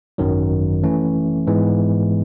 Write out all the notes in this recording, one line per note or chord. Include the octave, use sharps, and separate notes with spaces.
G#1 F#2 D#3 F#3
E3 A3 C#4
G#2 E3 G#3 B3